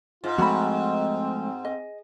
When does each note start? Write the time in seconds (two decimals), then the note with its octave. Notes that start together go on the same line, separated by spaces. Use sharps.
0.24 G#2 F4
0.38 F3 G#3 A3 C4 F#4 B5
1.65 D#5